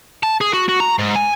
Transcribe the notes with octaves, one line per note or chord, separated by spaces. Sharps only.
A5
G#4
F#4
F#4
A#5
G#2
G#5